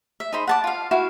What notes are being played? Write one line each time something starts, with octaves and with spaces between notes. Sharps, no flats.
E5
D#4 G#4 C5 B5
F#5 A5 D6
F4 F5
E4 F#4 F5